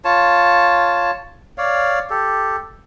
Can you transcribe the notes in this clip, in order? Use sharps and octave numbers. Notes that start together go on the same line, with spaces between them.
F4 C#5 A5
C#5 D5 F5
G4 A4